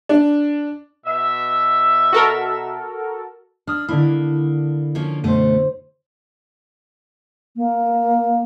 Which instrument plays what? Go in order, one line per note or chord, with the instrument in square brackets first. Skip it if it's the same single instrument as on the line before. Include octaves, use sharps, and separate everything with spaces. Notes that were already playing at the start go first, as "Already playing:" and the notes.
[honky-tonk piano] D4
[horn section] B2 E5
[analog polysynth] F#4 A4 A#4
[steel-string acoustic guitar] D4 [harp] D#6 F6
[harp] D3 D4 E4 [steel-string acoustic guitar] A#3
[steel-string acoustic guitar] F3 A#3 C#4
[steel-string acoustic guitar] F#2 B2 A3 [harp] C5 D#7
[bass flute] A#3